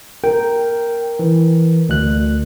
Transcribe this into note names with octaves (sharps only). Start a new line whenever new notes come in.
A#4 G5
E3
D2 F#6